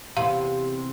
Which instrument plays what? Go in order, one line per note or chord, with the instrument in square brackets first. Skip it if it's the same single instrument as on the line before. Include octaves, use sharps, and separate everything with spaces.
[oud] E2 C3 [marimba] F5